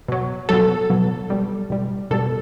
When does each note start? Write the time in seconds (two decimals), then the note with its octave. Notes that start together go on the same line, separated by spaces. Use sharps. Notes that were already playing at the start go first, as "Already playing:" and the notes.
0.08 B2 F#3
0.49 B2 F#3 A4
0.90 B2 F#3
1.30 B2 G3
1.70 B2 G3
2.11 B2 G3 A4